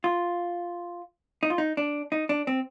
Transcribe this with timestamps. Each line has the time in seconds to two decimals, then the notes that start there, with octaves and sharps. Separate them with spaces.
0.04 F4
1.43 D#4
1.50 F4
1.58 D#4
1.77 D4
2.12 D#4
2.29 D4
2.47 C4